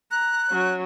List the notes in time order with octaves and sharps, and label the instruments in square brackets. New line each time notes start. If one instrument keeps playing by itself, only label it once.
[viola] A#5 [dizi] F#6
[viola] F#3 C#4